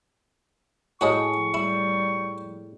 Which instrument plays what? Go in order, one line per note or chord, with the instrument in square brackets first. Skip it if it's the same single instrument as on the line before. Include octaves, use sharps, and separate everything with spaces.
[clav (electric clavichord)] A2 G#4 [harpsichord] F#4 C#5 D#5 [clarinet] C#6
[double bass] G3 [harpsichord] E4